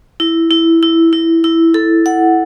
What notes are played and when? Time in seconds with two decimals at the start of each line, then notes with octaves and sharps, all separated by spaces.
0.20 E4
0.51 E4
0.83 E4
1.13 E4
1.44 E4
1.74 A4
2.06 F#5